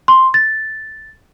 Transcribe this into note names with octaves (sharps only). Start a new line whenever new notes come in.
C6
A6